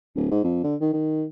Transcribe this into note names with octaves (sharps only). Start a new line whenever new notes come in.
D1
G#2
F2
D3
D#3
D#3